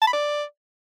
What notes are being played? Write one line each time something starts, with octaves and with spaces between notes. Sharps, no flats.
A5
B5
D5